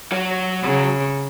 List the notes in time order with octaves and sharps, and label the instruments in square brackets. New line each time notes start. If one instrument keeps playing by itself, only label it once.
[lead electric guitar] F#3 F#4
[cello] C#3